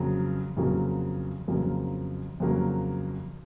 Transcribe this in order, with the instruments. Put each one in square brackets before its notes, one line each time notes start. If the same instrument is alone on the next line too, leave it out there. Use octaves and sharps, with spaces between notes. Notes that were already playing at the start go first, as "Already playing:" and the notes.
Already playing: [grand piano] F2 C#3 F#3 A#3
F2 C#3 F#3 A#3
F2 C#3 F#3 A#3
F2 C#3 F#3 A#3